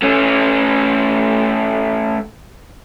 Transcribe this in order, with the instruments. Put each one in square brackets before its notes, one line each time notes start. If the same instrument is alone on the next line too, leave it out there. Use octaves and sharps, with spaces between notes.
[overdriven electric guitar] A3 C#4